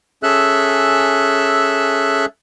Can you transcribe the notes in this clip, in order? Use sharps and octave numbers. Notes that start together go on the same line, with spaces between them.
C#4 G#4 A4 E5 E6 F#6